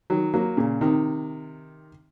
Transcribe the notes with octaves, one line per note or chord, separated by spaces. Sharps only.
D#3 F#3
F#3 A#3
A#2 C#3
C3 D#3